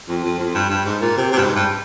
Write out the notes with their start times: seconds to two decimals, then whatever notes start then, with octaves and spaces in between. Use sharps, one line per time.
0.08 F2
0.24 F2
0.40 F2
0.55 G2
0.70 G2
0.85 G#2
1.01 A#2
1.17 C3
1.32 C3
1.38 G2
1.44 G#2
1.55 G2